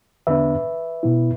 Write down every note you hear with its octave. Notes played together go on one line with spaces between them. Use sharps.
E2 D3 B3 D4 B4 E5
B2 B3 E4